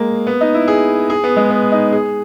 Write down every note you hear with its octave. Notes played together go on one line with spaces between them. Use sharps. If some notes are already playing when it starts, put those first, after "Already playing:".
Already playing: G#3 A#3
B3
D#4
E4
G#4
G#4
B3
G#3
B3
D#4
G#4